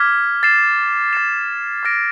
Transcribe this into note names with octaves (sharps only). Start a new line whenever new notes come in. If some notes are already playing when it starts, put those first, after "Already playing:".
Already playing: D6 F6 G#6 B6
A6 C7 E7
A6 C7 E7
D6 F6 A#6 D7